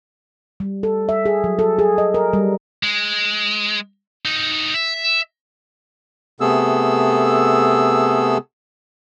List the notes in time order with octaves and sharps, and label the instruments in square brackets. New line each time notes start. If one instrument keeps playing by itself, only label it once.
[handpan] G3
A4
E5
G#4
F#3
A4
G#4
D#5
A#4
G3
[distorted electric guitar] G#3
D#4 F#4
E5
[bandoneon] C3 A3 B3 G#4 A4 E6